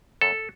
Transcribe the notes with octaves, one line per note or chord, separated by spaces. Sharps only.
F#2 A4